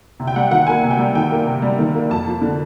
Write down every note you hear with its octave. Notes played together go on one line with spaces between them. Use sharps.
C3
G5
G3 F#5
D#3 F#5
A#3 G#5
C3
G5
G3
D#3 G5
A#3
C3
G3
D#3
A#3
F2 A5
F3
D3